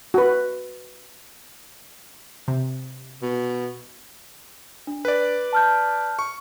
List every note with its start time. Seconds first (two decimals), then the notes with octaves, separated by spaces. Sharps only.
0.14 F#4 B4
2.48 C3
3.22 B2
4.87 D4
5.05 B4 D5
5.53 A5 F6 G6
6.19 C#6